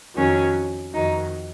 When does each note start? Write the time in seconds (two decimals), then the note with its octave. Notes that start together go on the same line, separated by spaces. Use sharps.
0.15 F2 D#3 F#3 C#4
0.93 F2 D#3 F#3 D#4